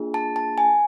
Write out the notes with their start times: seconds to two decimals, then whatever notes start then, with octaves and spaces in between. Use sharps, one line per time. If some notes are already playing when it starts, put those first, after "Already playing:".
Already playing: A#3 D4 F4 G#4
0.14 A5
0.36 A5
0.58 G#5